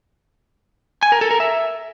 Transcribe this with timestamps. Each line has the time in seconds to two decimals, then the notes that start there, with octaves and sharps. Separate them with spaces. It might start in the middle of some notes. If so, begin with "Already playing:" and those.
1.03 G#5
1.12 A#4
1.21 A4
1.31 A#4
1.40 E5